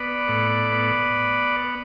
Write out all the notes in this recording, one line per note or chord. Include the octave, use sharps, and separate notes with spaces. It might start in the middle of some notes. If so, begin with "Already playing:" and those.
Already playing: B3 B4 D5
A2
B3